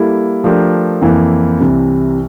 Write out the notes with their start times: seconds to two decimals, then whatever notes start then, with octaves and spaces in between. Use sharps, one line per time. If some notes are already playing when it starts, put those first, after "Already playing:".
Already playing: G3 A#3 E4 A4
0.44 F3 A3 D4 G4 A#4
1.02 F2 E3 A#3 E4
1.61 C2 C3 E3